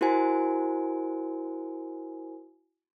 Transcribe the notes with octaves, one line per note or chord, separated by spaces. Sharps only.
E4 F#4 A#4 C5 G#5